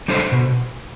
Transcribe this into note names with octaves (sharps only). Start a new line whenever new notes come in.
G3 D4 A4 C5
B2